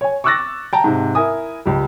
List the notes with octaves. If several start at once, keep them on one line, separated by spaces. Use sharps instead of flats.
C#5 G#5
C#6 D6 E6 F#6 A6 A#6
G5 A5 A#5
G#2 C3
E4 A#4 G#5 D#6
C#2 G3